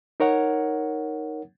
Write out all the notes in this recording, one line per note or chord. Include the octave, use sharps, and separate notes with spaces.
D#4 A#4 C#5 F#5